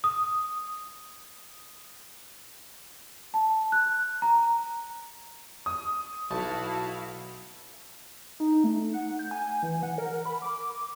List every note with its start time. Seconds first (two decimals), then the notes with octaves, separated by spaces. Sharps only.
0.04 D#6
3.34 A5
3.72 F#6
4.22 A#5
5.66 D#6
6.31 B1 E4 F#4 F5 A5
8.40 D#4
8.64 A3
8.93 F#5
9.19 G6
9.31 G#5
9.63 E3
9.83 F#5
9.98 A#4
10.25 B5
10.42 D6